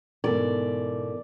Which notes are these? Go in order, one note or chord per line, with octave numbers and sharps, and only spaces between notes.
G#2 B2 E3 B3 A4 A#4 D5